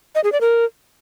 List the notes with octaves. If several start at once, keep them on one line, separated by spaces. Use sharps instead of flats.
D#5
G#4
D5
A#4